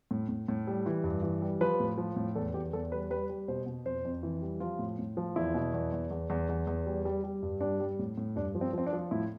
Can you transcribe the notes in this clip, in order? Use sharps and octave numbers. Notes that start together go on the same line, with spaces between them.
A2
A2
A2
G3
E3
G2
E3
G3
F3 B4
A2
F3
A2
E2 A4
E2 G4
E2 A4
G3 B4
G3 B4
G3
B2 C5
B2
F2 C5
F2
E3
G3
F3 F4
A2
A2
F3
E2 E4
B2
E2
E2
E2
E2
E2
E2
G3
G3
G3
G2
G3 D4
G3
A2
A2
G2 D4
F3
C4
F3 C4
D4
F3
A2 E4